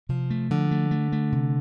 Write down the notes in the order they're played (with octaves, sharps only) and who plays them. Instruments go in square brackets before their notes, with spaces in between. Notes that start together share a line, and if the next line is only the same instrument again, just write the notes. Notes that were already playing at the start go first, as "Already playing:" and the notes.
[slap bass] C3 [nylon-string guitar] F3
[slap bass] A3
[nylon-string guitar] D3 [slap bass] F3
[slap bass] A3
A3
A3
C3